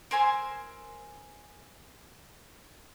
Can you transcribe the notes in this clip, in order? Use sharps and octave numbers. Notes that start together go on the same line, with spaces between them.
A#4 C5 G#5 E6